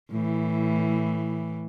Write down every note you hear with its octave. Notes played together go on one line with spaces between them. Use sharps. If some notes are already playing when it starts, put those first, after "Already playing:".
A2 E3